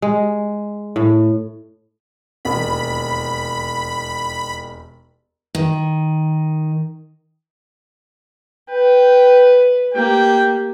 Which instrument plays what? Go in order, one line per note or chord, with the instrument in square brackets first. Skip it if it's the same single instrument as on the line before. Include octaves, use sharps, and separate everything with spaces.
[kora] G#3
A2
[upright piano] E1 D#2 [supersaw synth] B5
[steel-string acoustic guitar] D#3
[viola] B4 [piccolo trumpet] G5
[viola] A#3 G4 [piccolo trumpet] G5